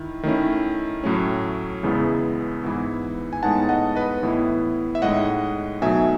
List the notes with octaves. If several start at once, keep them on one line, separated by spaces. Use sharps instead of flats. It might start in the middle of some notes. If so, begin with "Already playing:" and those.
Already playing: D#3 E4
D#3 A3 C#4 E4
A2 F#3 A3 C#4
E2 C#3 G#3 B3 E4
G#2 E3 B3 E4
G#5
A2 G#3 B3 D#4 F#5 A5
D#5 F#5
B4 D#5
A2 E3 B3 E4
E5
A2 G#3 D#4 D#5 F#5
B2 F#3 A3 D#4 E5 G#5